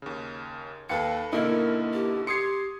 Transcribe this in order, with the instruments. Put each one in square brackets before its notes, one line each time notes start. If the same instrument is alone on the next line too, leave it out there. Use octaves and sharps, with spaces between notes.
[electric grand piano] D#2 C#3
[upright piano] D#2 [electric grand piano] A4 B4 C#7 [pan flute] F5
[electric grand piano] B2 D3 [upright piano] A#3 D#4 E4 [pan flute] A#4
[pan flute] G4
[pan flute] G4 [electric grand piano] C6 D#6 G#6 [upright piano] C7 C#7